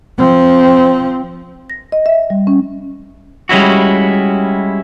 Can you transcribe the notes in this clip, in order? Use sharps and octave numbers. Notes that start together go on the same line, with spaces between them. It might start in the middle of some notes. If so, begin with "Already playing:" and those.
F3 C4
A#6
D#5
E5
G3
C#4
G3 G#3 C#4 E4 F#4